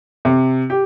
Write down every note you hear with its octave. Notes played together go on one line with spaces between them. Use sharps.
C3
G4